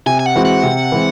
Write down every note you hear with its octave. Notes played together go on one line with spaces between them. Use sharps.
C3 G#5
G#5
F#5
E3 G#3 C4 F#4
F#5
C3
E3 G#3 C4